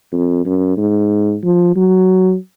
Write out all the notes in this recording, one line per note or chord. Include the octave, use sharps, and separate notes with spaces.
F2
F#2
G#2
F3
F#3